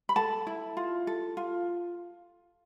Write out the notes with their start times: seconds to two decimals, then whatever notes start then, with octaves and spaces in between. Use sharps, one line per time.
0.09 B5
0.16 A4 A5
0.47 E4
0.77 F4
1.07 A4
1.37 F4